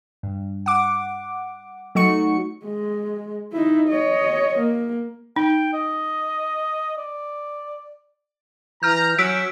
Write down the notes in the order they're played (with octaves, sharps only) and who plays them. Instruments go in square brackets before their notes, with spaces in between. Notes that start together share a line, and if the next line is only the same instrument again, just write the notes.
[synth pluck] G2
F#5 D6
F#3 A3 D#4 F#4 C#6 C#7
[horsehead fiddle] G#3
D#4 E4
C#5 D#5
A#3
[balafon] D#4 [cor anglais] G5
[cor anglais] D#5
D5
[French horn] E3 [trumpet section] A#5 [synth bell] F6 G6
[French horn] F#3 [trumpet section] C#4 E5 F#5 [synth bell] E6 B6 D7